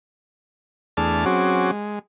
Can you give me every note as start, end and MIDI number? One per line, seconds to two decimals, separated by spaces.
0.97 1.25 40
0.97 1.25 57
0.97 1.25 62
0.97 1.25 68
0.97 1.25 81
0.97 1.25 89
1.26 1.71 54
1.26 1.71 60
1.26 1.71 61
1.26 1.71 66
1.26 1.71 68
1.26 1.71 86
1.71 1.99 56